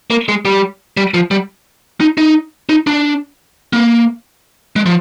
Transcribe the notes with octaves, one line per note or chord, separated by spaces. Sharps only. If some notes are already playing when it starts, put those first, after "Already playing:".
A#3
G#3
G3
G3
F3
G3
D#4
D#4
D#4
D4
A#3
G#3
F3